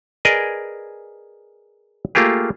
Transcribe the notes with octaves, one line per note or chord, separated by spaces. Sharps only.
G#4 A#4 B4 D5 D#5 G#5
A3 A#3 F4 G4 G#4